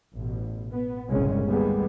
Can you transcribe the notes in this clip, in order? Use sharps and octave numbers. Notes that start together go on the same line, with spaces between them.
A1 B2
B3
G1 C2 A#2 C#3 G#3 C#4
D#3 G3 G#3 A#3 B3